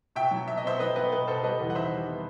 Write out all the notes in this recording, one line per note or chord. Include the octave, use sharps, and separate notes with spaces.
B2 E5 G5
F#3
B2 E5
D#5
B3 C5 E5
F#3 B4 D#5
B3 B4 D#5
B2 B4
B2 A4 C5
G3 B4 D#5
E2
F#5
D#3 C5 E5
G3
B3